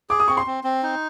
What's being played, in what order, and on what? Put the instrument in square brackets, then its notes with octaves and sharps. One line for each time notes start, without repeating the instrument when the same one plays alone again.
[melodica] G#4 [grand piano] D6
[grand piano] D#6
[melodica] C4 [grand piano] C#6
[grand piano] C6
[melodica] C4
C4
D#4